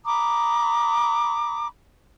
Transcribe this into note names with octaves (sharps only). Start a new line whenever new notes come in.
A#5 B5 D6 D#6